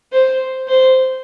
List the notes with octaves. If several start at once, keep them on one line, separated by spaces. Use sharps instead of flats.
C5
C5